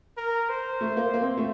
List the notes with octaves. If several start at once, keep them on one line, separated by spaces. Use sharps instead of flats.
A#4
C5
A3
A#3
A#3
C4
A3